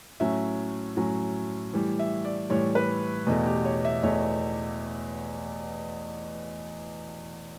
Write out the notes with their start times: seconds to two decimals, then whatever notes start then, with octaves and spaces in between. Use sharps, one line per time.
0.20 A2 F#3 C#4 E5
0.97 A2 F#3 C#4
1.73 A2 E3 G3
1.99 E5
2.25 D5
2.50 A2 E3 G3 C#5
2.75 B4
3.27 E2 B2 A3
3.46 G4
3.65 C#5
3.85 E5
4.03 E2 B2 A3 C#5